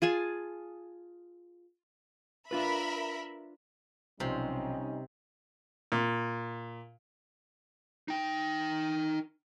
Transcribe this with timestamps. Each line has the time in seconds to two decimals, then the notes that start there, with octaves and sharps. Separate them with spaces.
0.02 F4 G#4 G#5 A5
2.51 D4 F4 A#4 B4 E5 B5
4.20 B1 C3 F3 G3 C#4 D#4 C6
5.92 A#2
8.08 D#4 G5